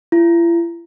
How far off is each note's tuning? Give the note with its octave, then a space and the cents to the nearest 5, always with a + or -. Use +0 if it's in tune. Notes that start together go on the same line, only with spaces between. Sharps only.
E4 +45